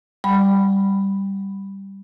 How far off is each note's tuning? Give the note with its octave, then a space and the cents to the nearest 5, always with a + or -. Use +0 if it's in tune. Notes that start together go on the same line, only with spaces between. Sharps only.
G3 +0 F#5 +0 B5 +0